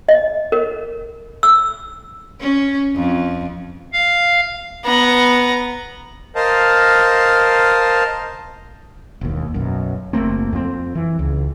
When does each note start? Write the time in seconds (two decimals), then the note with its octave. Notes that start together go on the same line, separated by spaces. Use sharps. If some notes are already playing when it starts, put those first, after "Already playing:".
0.09 D#5
0.52 A#4
1.43 E6
2.41 C#4
2.96 F2
3.93 F5
4.84 B3 A#5
6.35 A#4 C5 D#5 F5 A5
9.21 E1 D#2
9.54 B1 F#2
10.13 F#1 A3 A#3 C4
10.53 F2 C4
10.95 E3
11.19 C#2